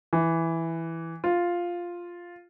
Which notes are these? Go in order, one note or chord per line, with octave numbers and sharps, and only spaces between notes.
E3
F4